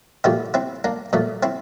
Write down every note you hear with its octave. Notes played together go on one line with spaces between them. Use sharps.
A#2 F3 A3 E4 G4
C4 E4
A#3 D4
A#2 F3 A3
C4 E4